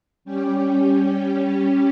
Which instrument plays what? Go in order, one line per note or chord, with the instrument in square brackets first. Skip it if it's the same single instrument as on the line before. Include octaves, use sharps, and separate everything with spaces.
[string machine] G3 C#4 G4